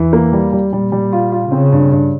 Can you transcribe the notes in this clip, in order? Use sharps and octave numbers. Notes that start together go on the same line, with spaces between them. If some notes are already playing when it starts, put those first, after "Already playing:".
Already playing: E2 E3
A#3
G3
G3
A#2 G3
G3
F4
F4
C#3 C4
G2
G2